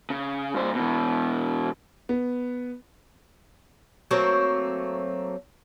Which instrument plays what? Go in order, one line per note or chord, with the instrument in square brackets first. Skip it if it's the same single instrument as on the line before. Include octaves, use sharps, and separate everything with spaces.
[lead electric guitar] C#3
G2 C5
B2 E3
[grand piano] B3
[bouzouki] F#3 A3 A#3 C4